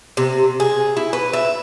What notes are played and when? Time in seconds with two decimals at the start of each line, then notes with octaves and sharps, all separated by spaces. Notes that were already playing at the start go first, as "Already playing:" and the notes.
0.17 C3
0.60 G#4
0.97 E4
1.13 B4
1.33 E5